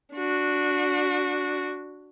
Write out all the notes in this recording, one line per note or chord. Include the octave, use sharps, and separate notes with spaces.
D4 F#4